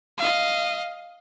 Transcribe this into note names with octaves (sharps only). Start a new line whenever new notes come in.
D#5 F5